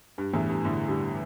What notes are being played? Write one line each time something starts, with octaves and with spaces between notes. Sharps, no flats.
G2
E2 A2
G2
A2 D3
D3 G3